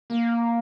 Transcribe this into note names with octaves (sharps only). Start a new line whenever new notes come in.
A#3